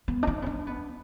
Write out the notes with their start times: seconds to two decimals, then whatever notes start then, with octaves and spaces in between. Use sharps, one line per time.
0.08 B3
0.23 D4
0.27 D#4
0.42 B3
0.46 D4
0.67 B3